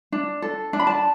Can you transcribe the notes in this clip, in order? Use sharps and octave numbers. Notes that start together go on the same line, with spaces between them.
D4
A4
D4 A5
B5
A5